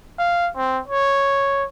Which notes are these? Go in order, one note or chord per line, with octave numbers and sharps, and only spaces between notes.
F5
C4
C#5